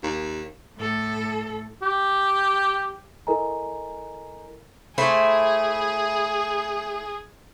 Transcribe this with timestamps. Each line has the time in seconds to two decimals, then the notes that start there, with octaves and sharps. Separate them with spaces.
0.03 D#2
0.77 A2 A4
1.83 G4
3.27 E4 A4 A#4 D#5 G#5 A#5
4.98 A3 E4 G#4 C5